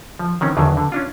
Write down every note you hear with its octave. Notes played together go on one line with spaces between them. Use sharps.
F3
D#3 E3 C4 C#4
E2 D3 D#3 F#3
D3
C#4 D4 F4